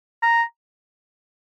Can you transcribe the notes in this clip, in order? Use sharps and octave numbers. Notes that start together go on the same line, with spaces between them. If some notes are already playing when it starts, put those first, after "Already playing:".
A#5